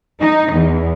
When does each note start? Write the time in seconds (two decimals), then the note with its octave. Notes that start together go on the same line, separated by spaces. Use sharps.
0.20 D#4
0.53 E2